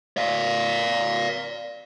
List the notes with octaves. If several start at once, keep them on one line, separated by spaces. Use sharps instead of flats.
D5 F5